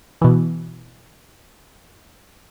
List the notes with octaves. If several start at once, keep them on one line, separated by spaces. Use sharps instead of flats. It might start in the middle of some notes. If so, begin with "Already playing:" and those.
B2 E3